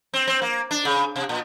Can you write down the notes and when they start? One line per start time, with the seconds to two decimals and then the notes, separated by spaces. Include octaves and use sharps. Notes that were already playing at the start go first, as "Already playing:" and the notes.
0.14 C4
0.27 C4
0.42 A#3
0.71 D4
0.85 C#3
1.16 C3
1.29 A#2